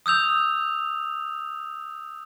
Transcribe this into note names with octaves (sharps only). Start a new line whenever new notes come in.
D#6 E6 G6 F7